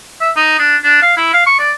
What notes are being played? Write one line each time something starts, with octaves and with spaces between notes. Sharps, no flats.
E5
D#4
D4
D4
F5
E4
F5
C#6
D5